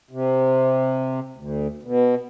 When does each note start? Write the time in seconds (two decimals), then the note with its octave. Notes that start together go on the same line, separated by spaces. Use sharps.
0.11 C3
1.36 D2
1.83 B2